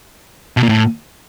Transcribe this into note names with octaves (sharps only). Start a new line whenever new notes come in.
B2
A#2
A2